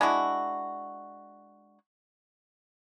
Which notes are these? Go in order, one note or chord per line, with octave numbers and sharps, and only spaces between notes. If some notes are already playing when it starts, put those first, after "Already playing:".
G#3 D4 E4 F#4